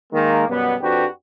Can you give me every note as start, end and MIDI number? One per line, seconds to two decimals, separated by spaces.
0.13 0.46 51
0.13 0.46 56
0.13 0.46 58
0.49 0.75 42
0.49 0.75 47
0.49 0.75 55
0.49 0.75 59
0.81 1.05 41
0.81 1.05 62
0.81 1.05 66
0.81 1.05 67
0.81 1.05 71